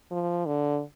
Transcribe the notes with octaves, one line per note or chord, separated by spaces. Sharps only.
F3
D3